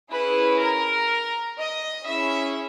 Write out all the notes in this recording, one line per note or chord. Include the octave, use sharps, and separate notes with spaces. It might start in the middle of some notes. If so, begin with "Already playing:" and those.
C#4 E4 G#4 B4
A#4
D#5
C#4 E4 G#4 E5